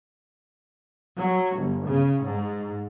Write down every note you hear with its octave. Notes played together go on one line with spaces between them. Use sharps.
F#3
G1
C#3
G#2